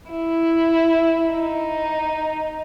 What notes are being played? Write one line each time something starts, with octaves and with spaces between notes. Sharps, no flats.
E4
D#4